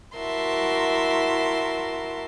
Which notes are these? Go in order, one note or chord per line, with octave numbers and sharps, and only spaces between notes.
E4 F#4 A#4 E5 A5 C6